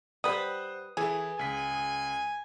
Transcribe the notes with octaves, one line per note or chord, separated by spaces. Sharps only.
G3 B4 C5 F#5 D#6
E3 E4 G#4 A4
C#2 G#5 B6